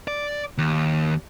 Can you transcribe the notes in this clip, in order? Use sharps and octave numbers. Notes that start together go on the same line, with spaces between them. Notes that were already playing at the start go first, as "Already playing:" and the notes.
D5
D#2